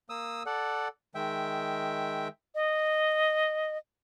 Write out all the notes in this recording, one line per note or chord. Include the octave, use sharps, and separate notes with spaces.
A#3 D#6 E6
A4 D5 F#5
D#3 G#3 E5 G5
D#5